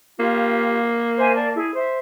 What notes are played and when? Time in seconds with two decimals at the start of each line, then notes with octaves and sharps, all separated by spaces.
0.19 A#3 F4 G4
1.19 C5 E5 G#5
1.36 D5 A5
1.56 E4 G#4
1.75 C5 E5